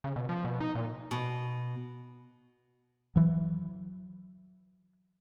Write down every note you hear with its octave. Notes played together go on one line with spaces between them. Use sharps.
C#3
B2
F3
B2
D#4
A#2
B2
E3 F#3